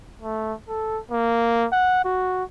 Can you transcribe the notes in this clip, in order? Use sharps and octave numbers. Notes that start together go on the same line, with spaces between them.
A3
A4
A#3
F#5
F#4